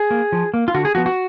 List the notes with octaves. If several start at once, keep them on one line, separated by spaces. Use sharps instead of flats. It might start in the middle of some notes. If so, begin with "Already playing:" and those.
Already playing: G#4
A#3
F3
A#3
F4
D3 F#4
G#4
F3 B3 F#4
F#4